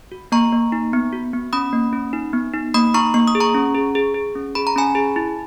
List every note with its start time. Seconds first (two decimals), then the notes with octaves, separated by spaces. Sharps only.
0.12 F#4
0.32 A#3 A#5 C#6
0.52 A#3
0.72 D#4
0.93 B3
1.13 F#4
1.33 B3
1.53 C#4 B5 D#6
1.73 A#3
1.93 C#4
2.13 D#4
2.33 B3
2.53 D#4
2.74 A#3 B5 D#6
2.94 D#4 A#5 C#6
3.14 A#3 C#6
3.28 D#6
3.35 G#4
3.40 A#5 C#6
3.54 C#4
3.75 G#4
3.95 G#4
4.14 G#4
4.35 C#4
4.55 G#4 B5
4.67 A#5
4.76 C#4 G#5 B5
4.95 G#4
5.16 E4